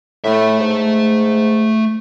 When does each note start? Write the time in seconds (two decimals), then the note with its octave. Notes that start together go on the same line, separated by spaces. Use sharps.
0.24 A2 A3 E5
0.60 G#2